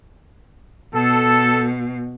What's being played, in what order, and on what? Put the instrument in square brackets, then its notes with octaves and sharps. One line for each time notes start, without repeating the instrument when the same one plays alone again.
[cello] B2 [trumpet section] A4